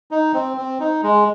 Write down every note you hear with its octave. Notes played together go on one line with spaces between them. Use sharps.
D#4
C4
C4
D#4
G#3